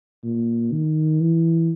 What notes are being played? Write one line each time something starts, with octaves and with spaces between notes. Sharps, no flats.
A#2
D#3
E3